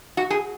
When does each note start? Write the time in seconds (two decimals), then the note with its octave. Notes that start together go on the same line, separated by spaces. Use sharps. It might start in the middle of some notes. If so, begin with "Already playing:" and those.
0.17 F#4
0.30 G#4